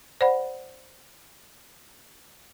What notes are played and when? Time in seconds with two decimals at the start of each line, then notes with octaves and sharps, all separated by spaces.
0.21 C5 D5 F#5 B5